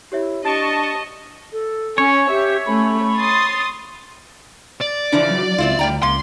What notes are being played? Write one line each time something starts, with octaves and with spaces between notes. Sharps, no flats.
E4 G4 C#5 E5
D4 G4 D#5 A5 C#6 A6 D7
A4
C#4 C#5
G4 E5
A3 C#4 B5
C6 D#6 A6
D5
C#3 E3 F3 D4
F#3
C#2 C4 E4 F4
D2 G3 G5 A#5
C#2 A#3 C6